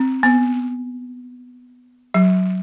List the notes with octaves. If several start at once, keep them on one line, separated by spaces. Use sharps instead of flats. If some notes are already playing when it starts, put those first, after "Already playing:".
Already playing: C4
B3
F#3